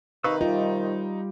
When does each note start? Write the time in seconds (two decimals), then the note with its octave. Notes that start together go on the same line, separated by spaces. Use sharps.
0.24 C3 D#3 D#4 B4 F5 C#6 E6
0.41 G3 D#4 F4